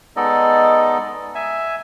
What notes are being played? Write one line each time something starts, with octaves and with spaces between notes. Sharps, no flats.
G#3 B3 D#4 A4 D5 D#5
E5 G#5